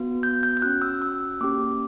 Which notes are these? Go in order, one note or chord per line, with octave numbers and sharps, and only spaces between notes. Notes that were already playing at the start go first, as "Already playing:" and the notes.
Already playing: B3 F#4
G6
G6
G6
C#4 F#4 F#6
E6
E6
A#3 C#4 G4 D6